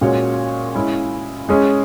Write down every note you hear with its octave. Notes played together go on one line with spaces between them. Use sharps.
A#2 G#3 C#4 F#4 C#5
G#3 C#4 E4
G#3 C#4 G#4 D#5